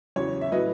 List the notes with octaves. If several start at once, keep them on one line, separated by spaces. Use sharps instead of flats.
E2 C#3 F#3 C#5
E5
A2 F#3 B4 D#5